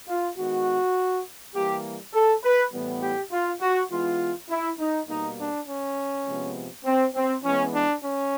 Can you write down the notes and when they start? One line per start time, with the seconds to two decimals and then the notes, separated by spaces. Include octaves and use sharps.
0.09 F4
0.37 D#3 G#3 B3 F#4
1.55 E3 G3 A#3 G4
2.14 A4
2.44 B4
2.73 A2 E3 G3 B3
3.03 G4
3.32 F4
3.61 F#4
3.91 E3 G#3 B3 F4
4.50 E4
4.79 D#4
5.08 B2 G3 A#3 D#4
5.39 D4
5.68 C#4
6.26 C3 F3 G#3 B3
6.85 C4
7.15 C4
7.43 E3 G#3 B3 C#4
7.74 D4
8.03 C#4